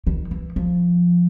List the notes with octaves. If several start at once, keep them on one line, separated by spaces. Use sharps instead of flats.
D#3
E3
F3